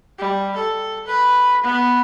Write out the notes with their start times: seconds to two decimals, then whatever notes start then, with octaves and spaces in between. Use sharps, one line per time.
0.18 G3
0.56 A4
1.07 B4
1.64 B3